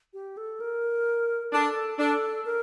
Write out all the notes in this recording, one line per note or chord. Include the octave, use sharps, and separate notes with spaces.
G4
A4
A#4
D4 A4
D4 A4
A#4